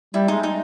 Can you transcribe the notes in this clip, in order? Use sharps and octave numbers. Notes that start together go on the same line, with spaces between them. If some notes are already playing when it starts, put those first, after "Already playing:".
G3 E4
G#3 D#4
D#4